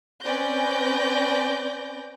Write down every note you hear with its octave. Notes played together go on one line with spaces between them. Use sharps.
C4 C#4 B4 D5 G6 A#6